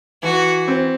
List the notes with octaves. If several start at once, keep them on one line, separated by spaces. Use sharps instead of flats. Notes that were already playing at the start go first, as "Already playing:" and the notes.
E3 F#4
C4